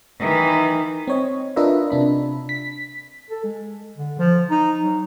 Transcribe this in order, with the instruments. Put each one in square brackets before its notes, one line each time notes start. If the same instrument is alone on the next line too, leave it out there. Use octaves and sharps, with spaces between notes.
[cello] D#3 E3
[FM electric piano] C4 C#5 D#5
D4 F4 A#4 B4 D#5 E5
C3 D4 B5
B6
[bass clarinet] A4
G#3
D3
F3
D#4
F#3